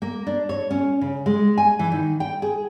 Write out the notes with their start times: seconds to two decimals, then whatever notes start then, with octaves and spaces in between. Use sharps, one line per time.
0.02 A#3
0.27 D4
0.49 C#5
0.70 C#4
1.01 C#3
1.26 G#3
1.58 G#5
1.79 E3
1.92 D#3
2.20 G5
2.42 G#4